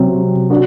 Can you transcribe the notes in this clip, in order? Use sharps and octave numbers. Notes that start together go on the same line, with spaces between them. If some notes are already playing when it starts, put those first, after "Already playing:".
Already playing: C3 F#3 C4
D4 F#4